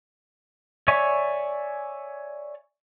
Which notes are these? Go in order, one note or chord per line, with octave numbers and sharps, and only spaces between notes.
C#5 D5 E5 G#5 C#6